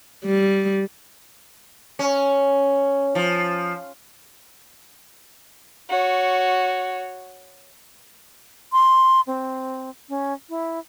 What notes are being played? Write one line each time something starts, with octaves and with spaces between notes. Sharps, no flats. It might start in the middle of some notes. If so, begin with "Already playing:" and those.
G3
C#4
F3
F#4 C#5
C6
C4
C#4
E4